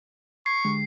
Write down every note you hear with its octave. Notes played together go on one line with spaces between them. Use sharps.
C#6 G#6 C7
D3 G#3 G4